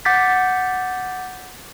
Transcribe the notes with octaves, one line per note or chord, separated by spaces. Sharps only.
F#5 D6 G6 A6 B6